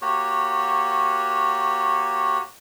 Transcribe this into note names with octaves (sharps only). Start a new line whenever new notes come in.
A#3 F#4 G4 C#5